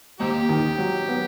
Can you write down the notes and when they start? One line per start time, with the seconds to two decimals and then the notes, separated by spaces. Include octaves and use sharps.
0.20 D#2 C4 D#4 G4
0.49 D#3
0.78 F#3
1.08 B3